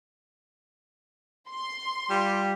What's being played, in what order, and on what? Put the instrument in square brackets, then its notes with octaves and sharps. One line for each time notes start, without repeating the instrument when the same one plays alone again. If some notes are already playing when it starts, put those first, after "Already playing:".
[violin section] C6
[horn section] G3 F4 G4